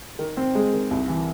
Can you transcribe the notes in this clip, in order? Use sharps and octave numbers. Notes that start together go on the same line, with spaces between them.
D#3
C4
G#3
D#3
C2
E3